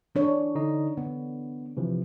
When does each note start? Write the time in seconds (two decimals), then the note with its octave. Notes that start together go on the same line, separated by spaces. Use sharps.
0.15 E3 D4 C#5
0.55 D3 D#4 D#5
0.97 D3 B3
1.77 C3 E3 F3